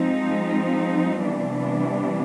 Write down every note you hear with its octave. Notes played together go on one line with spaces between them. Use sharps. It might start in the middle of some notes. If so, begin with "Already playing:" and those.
Already playing: F3 G#3 C4 D#4
C3 E3 G3 B3 D4